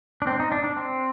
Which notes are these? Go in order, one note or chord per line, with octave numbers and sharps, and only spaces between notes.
D4
C4
D#4
D4
D4
C4